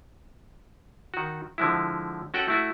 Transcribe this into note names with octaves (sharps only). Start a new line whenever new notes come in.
D#3 F#4
D3 F3 G#3 E4
C#4 F#4 A4 F#5 G5
A3 E4 F#4